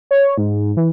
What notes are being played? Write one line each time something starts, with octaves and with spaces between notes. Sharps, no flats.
C#5
G#2
E3